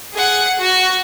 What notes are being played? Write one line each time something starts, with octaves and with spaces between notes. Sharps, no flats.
G#4 F#5
F#4